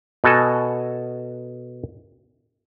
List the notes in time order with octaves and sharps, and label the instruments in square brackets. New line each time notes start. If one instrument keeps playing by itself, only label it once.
[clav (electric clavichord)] B2 F#4 A4 G#5